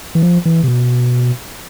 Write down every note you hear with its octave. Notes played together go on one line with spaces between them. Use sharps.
E3
F3
E3
C3
B2